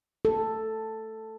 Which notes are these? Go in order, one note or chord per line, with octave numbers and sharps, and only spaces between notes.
A4